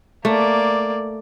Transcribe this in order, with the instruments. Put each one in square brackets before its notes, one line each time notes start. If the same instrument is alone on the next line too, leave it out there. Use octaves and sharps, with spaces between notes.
[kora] A3 [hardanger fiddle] A#3 D5